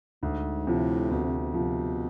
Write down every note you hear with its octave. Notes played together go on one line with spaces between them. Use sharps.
D2 G#2
A2 C3 F3
D2 B2
C3
B2
C3 F3